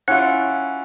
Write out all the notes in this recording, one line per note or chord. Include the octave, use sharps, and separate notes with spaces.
C#4 E4 F4 F#5 F#6